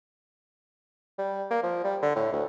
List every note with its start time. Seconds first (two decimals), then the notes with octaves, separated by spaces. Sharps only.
1.18 G3
1.51 A#3
1.63 F3
1.84 G3
2.02 D3
2.16 A2
2.32 D2